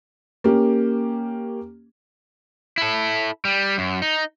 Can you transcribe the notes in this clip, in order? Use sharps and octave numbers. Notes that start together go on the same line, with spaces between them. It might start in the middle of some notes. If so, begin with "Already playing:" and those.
A#3 C#4 G4
E4 A4
G3
F#2
D#4